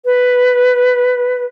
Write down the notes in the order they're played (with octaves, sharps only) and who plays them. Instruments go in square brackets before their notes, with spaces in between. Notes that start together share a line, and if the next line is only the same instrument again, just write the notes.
[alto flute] B4